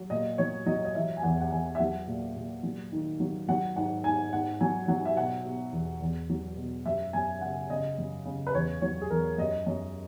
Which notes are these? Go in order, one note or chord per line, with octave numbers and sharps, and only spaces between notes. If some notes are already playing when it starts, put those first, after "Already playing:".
Already playing: F#3
A#2 D#5
F#3 C#5
F#3 D#5
D#5
E3 E5
G#5
E2 F#5
F#5
E2 G#5
E5
F#3 F#5
A#2
A#2
F#3
D#3
F#3
F#3 F#5
G#2 F#5
G#2 G#5
G#2 F#5
F#3 G#5
F#3 F#5
E5
B2 F#5
B2
E2
E2
F#3
B2
F#2 E5
F#2 G#5
C#3 F#5
C#3 D#5
F#2
C#3
B4
E2 C#5
F#3 C#5
G#4
E2 A#4
F#2 D#5
F#2